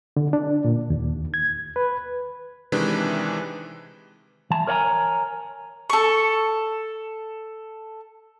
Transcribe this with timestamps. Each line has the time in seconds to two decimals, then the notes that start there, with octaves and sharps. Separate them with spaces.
0.17 D3
0.33 D4
0.65 A#2
0.90 D#2
1.34 G#6
1.76 B4
2.72 C3 D#3 E3 G#3 D4 B4
4.50 E3 A5
4.67 A#4 C#5 D#5 F#5 G#5 A#5
5.90 A4 C#6